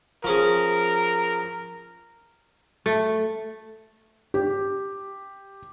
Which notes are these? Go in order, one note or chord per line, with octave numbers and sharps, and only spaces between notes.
F3 C#4 G#4 A#4
A3
G4